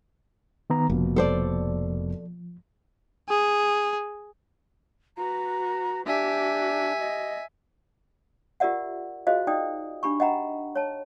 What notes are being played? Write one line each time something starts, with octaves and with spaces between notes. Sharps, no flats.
D#3 B3 A#5
F1 B2 F3 A#3
A4 C5 D5
G#4
F#4 B4 A#5
D4 G4 E5 G#5
D#5
F4 G4 A#4 D5 E5 F#5
F4 F#4 G#4 C5 D#5 F5
D#4 D5 G5 D#6
D4 G4 B5 C#6
D#5 E5 F#5 G5 A#5 B5
C#5 A5